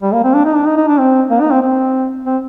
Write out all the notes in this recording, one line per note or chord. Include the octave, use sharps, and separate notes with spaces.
G3
A#3
C4
D4
D#4
D4
D#4
D#4
D4
C4
A#3
D#4
C4
C4
C4